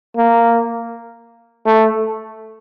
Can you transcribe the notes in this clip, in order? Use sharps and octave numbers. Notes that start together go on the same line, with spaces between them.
A#3
A3